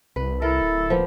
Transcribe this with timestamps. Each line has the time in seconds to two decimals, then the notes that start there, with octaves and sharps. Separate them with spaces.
0.16 C2 B4
0.42 E4 A4 A#4
0.62 D1
0.90 F3 A#3 B3